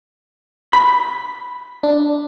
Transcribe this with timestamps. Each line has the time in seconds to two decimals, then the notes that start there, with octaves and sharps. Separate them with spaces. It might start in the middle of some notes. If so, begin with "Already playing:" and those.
0.73 B5
1.83 D4